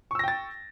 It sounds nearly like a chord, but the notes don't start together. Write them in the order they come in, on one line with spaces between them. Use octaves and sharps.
C#6 E6 A#6 G5 A6